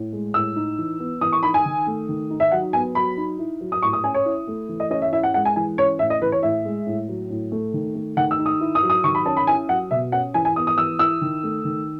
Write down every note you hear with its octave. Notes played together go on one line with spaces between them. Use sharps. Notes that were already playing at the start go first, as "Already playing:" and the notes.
Already playing: A2
G#3
A2 E6
D#4
E3
B3
E3 D#6
C#6
D#4 B5
G#5
D#3
A3
D#3
D#4
E5
F#3 F#5
B3 G#5
F#3 B5
D#4
E4
F#3
D#6
A2 C#6
D#6
C#4 G#5
C#5
E4
A3
E3
D#5
C#4 D#5
E5
E4 E5
F#5
G#3 F#5
G#5
E3 G#5
C#4 C#5
A2 E5
D#5
E3 B4
C#5
A2 E5
G#3
A2
F#3
A2
A3
D#3
A3
D#3 F#5
E6
D#4
D#6
E4
D#6
F#3
D#6
D#3 C#6
B5
C#4 A5
B5
E4 G#5
F#3 F#5
B2 E5
C#4 F#5
E3 G#5
G#5
B3 D#6
D#6
E3 E6
E4 E6
D#3
A3
D#3